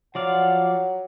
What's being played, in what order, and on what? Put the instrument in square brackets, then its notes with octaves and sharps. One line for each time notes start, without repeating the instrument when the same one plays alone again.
[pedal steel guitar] F3 D5 F5 [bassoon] F#3 [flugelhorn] F#5